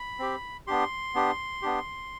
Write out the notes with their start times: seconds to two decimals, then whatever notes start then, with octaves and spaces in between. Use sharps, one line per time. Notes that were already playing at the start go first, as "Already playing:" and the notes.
Already playing: B5
0.19 C4 G4
0.67 B3 D4 G4 C6
1.15 B3 D4 G4
1.62 B3 D4 G4